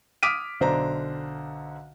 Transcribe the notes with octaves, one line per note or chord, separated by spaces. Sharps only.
D6 D#6 F6 B6 D7 D#7
B1 D3 C5 D5 A#5